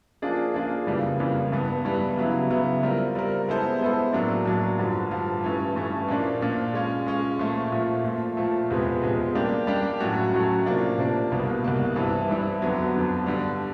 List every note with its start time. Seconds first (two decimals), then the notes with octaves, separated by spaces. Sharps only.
0.22 F3 A#3 D4 F4 G#4
0.54 F3 A#3 D4 F4 G#4
0.87 F2 C#3 E3 G3 A#3
1.19 F2 C#3 E3 G3 A#3
1.52 G2 E3 G3 B3
1.84 G2 E3 G3 B3
2.17 C#3 F#3 B3 E4
2.50 C#3 F#3 B3 E4
2.83 G3 C4 F4 A#4
3.15 G3 C4 F4 A#4
3.48 G#3 B3 E4 A4 C5
3.81 G#3 B3 E4 A4 C5
4.13 A2 F#3 A#3 D4
4.45 A2 F#3 A#3 D4
4.79 G2 D3 F3
5.11 G2 D3 F3
5.44 G2 E3 A3 C#4
5.76 G2 E3 A3 C#4
6.08 A#2 F3 A#3 D4
6.41 A#2 F3 A#3 D4
6.74 G#3 C#4 F4
7.06 G#3 C#4 F4
7.39 A#2 F3 A3
7.72 A#2 F3 A3
8.04 A#2 F3 A3
8.37 A#2 F3 A3
8.70 E2 C3 F3 G#3 B3
9.02 E2 C3 F3 G#3 B3
9.35 G3 A#3 D4 G4
9.67 G3 A#3 D4 G4
10.00 A2 F#3 A3 C#4 F#4
10.33 A2 F#3 A3 C#4 F#4
10.66 C3 F3 A#3 D4
10.98 C3 F3 A#3 D4
11.31 C2 B2 G3 A#3
11.64 C2 B2 G3 A#3
11.96 G2 E3 G3 C4 E4
12.29 G2 E3 G3 C4 E4
12.62 F2 D3 F#3 B3
12.94 F2 D3 F#3 B3
13.26 G2 D3 G3